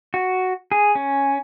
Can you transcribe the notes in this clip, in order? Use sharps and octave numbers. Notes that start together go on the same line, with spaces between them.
F#4
G#4
C#4